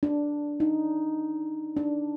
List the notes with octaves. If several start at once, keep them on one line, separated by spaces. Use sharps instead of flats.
D4
D#4
D4